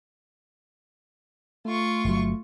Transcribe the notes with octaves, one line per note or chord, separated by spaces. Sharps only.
A3 F4 C#6
G1 F#3